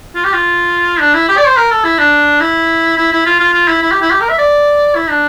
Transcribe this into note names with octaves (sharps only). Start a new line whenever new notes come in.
F4
G4
F4
D4
E4
G4
D5
C5
A#4
A4
E4
D4
E4
E4
E4
F4
F4
F4
E4
E4
G4
E4
G4
A#4
E5
D5
E4
D4